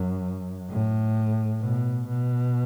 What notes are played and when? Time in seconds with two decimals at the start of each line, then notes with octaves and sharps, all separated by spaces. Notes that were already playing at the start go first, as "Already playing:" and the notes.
Already playing: F#2
0.70 A2
1.61 B2
2.08 B2